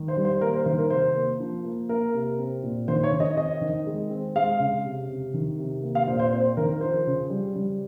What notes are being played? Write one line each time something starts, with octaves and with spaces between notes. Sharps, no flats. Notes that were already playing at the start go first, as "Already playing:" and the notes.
Already playing: D#3
C5
G3
C5
A#3 A#4
C5
D#3 C5
A#4
C3 C5
A#3
F3
A#3
A#3 A#4
C3
C4
A#2
D#3 C5
C#5
D#3
D#5
C4 D#5
D#3
G#3
C4
G#3 F5
C#3
C3
C3
D#3
C3
A#3
F5
A#2 C5
C5
C4 C5
D#3 A#4
F3 C5
C#3
G3
G3